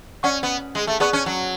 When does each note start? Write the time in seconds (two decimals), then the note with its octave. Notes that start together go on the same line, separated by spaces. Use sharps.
0.23 C#4 D5 F#5 C#6
0.43 B3
0.75 G#3
0.87 A3
1.00 B3 G#4 D5 A5 C#6 F#6
1.13 C#4
1.26 F#3